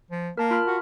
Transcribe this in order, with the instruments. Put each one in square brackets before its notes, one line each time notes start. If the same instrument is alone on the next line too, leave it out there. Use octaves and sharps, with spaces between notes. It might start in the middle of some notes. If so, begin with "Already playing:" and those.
[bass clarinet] F3
[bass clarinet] A#3 [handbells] A#4 A5
[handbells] F4 B5 F6
[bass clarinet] F#4